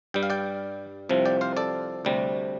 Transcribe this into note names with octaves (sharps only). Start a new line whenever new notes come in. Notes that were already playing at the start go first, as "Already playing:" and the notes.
G2 G3 G5
F5
D5 G5
C2 C3 F3
D5 G5
C5 F5
A4 D5
D2 C3 G3